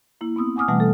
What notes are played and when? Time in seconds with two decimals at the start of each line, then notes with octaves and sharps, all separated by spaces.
0.21 A#3 E4
0.36 B3 C4 D#6 E6
0.56 F#5 G#5 D6 D#6 F6
0.68 B2 E3 G3 A3 F#5 G#5
0.80 A4